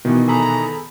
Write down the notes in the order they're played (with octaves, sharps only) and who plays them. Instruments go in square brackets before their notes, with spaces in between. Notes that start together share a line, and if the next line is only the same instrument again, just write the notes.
[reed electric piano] B2 [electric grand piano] D#3 E3 B3
[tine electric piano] G#4 A4 B5 [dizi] A#5